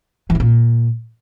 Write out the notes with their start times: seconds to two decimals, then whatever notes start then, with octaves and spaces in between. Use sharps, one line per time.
0.30 E3
0.35 G#2
0.40 A#2